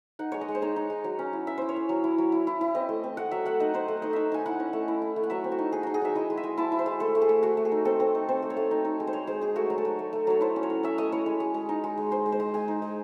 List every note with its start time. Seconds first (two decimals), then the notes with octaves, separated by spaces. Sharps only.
0.19 D#4 F#5
0.32 G#3 C#5
0.41 D#5
0.48 G#3
0.55 C5
0.62 D#4 C#5
0.76 D#4
0.90 G#3
1.04 F#3
1.19 C#4
1.33 E4
1.47 C#4 E5
1.58 E4 C5
1.69 C#5
1.76 C#4
1.89 F#3
2.04 E4
2.18 F#3
2.32 E4
2.47 E4
2.61 E4
2.75 C4 D#5
2.89 A3
3.04 C4
3.17 A3 F#5
3.31 F#3 E5
3.45 A3 F#5
3.60 D#4 D#5
3.74 D#4 C5
3.88 A3
4.02 D#4 D#5
4.13 D#4 E5
4.32 D#4 G#5
4.46 E4 F#5
4.60 C#4
4.73 A3
4.88 E4
5.02 E4
5.16 A3
5.23 F#5
5.30 F#3 E5
5.44 C4
5.52 F#4
5.59 D#4
5.72 D#4 G#4
5.83 D#4 F#4
5.94 G#4
6.02 F#3 E5
6.15 E4 D#5
6.30 G#3
6.37 E5
6.44 G#3
6.58 E4 A5
6.72 E4
6.79 C5
6.86 G#3
7.00 A3 A4
7.15 A3
7.22 G#4
7.29 A3
7.43 A3 F#4
7.57 A3
7.65 G#4
7.72 D#4
7.85 C4 A4
8.00 C4
8.15 D#4
8.29 C4 C5
8.42 A3
8.50 C#5
8.57 A3
8.71 D#4
8.85 D#4
9.00 G#3
9.07 C5
9.13 G#3 C#5
9.27 G#3 C5
9.41 G#3 G#4
9.55 A3 F#4
9.70 F#3
9.78 A4
9.85 F#3
9.99 A3
10.13 A3
10.27 F#3 C#5
10.41 E4 C5
10.56 C#4
10.63 C#5
10.70 C#4
10.83 C#4 E5
10.98 A3 D#5
11.12 E4 C#5
11.26 G#3
11.40 G#3
11.54 G#3
11.69 D#4
11.84 G#3
11.98 G#3
12.11 G#3 C5
12.26 G#3
12.32 C5
12.40 G#3
12.54 G#3 G#5
12.68 D#4
12.82 G#3